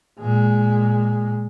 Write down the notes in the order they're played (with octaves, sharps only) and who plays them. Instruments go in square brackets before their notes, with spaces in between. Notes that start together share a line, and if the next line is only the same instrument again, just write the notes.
[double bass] A#2 G#3